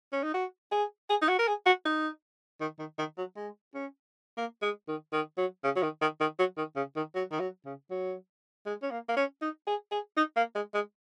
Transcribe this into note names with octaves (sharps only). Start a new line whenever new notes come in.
C#4
D#4
F#4
G#4
G#4
D#4
F#4
A#4
G#4
F#4
D#4
D#3
D#3
D#3
F#3
G#3
C#4
A#3
G#3
D#3
D#3
F#3
C#3
F#3
D#3
D#3
D#3
F#3
D#3
C#3
D#3
F#3
D#3
F#3
C#3
F#3
G#3
C#4
A#3
A#3
C#4
D#4
G#4
G#4
D#4
A#3
G#3
G#3